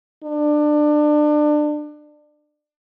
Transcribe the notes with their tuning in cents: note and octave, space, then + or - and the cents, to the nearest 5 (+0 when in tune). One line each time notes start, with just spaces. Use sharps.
D4 +25